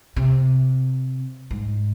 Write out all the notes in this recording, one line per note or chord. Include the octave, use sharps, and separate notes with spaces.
C3
G#2